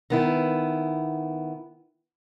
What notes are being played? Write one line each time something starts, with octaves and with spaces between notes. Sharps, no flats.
D#3 B3 E4